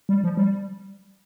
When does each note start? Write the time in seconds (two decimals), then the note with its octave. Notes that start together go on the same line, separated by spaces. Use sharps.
0.09 G3
0.24 F3
0.37 G3